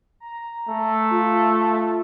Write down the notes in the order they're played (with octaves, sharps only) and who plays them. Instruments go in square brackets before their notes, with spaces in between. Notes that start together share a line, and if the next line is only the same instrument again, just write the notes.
[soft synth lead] A#5
[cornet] A3
[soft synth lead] F4